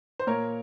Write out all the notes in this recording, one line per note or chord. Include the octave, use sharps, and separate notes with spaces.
C5
A#2 A#4 C#5